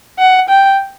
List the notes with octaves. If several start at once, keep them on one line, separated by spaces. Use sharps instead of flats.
F#5
G5